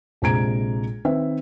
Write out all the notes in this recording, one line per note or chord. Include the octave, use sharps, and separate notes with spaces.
A#1 C3 G#3 A#5 G#6 D7
D#3 C4 B4 E5